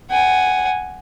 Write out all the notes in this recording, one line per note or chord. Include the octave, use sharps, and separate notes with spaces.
F#5 G#5